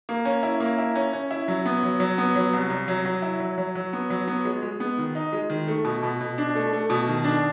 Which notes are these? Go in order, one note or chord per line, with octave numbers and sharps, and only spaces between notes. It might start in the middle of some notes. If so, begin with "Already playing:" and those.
A#3
C#4
E4
A#3
E4
C#4
C#4
E4
F#3
B3
F#3
F#3
B3
F#3
C2
C2
F#3
F#3
E4
F#3
F#3
F#3
B3
F#3
B3
G#3
G#3
B3
D#3
D#4
G#3
D#3
A3
B2
B2
B2
D4
A3
A3
B2
D#3
D4